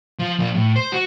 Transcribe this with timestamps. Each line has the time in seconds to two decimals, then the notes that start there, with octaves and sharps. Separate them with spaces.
0.19 F3
0.39 F3 A#3
0.55 A2
0.76 C5
0.92 F#4